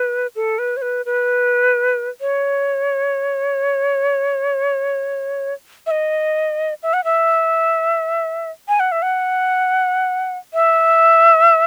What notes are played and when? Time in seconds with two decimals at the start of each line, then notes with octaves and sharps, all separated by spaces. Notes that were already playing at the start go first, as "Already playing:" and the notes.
Already playing: B4
0.36 A4
0.59 B4
0.77 C#5
0.82 B4
1.06 B4
2.21 C#5
5.87 E5
5.91 D#5
6.83 E5
6.93 F#5
7.04 E5
8.68 G#5
8.80 F#5
8.92 E5
9.02 F#5
10.54 E5